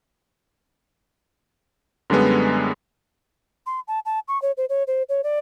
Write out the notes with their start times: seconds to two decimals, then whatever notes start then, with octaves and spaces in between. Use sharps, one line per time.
2.10 F#2 D3 G3 G#3 B3
3.66 C6
3.88 A5
4.05 A5
4.28 C#6
4.42 C#5
4.57 C5
4.69 C#5
4.87 C5
5.09 C#5
5.24 D5